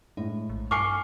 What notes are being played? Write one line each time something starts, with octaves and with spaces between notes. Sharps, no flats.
A2 G#3
A#1
G2 G#5 C#6 D6 F6 C7 C#7